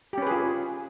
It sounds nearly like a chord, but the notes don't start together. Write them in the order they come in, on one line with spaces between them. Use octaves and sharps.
G4 C#4 B4 G#4 F4